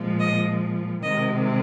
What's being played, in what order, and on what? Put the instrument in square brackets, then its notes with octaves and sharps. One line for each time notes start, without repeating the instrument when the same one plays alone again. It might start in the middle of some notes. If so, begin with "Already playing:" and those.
Already playing: [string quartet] A#2 F3 G#3
D#5
C3 D#3 G#3 D#5